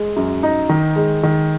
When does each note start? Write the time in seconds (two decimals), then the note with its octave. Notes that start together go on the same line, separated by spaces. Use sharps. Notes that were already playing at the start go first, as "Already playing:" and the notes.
Already playing: G#3
0.16 F#2
0.43 D#4
0.69 D#3
0.96 G#3
1.23 D#3